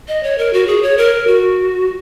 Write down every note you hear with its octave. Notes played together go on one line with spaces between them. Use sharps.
D#5
C#5
A#4
F#4
G#4
C#5
A#4
F#4